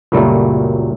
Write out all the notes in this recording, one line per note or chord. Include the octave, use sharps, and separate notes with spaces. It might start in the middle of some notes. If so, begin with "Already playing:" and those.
C#2 F#2 A#2 F#3 G3 A3